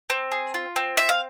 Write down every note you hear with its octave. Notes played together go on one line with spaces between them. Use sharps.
C4
G#4
F4
C4
C4 E5
F5